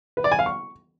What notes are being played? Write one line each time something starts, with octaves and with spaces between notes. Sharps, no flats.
B4
D5
G#5
F5
C#6